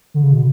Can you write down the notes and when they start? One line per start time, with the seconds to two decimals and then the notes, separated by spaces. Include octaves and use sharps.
0.14 D3
0.23 C#3
0.33 B2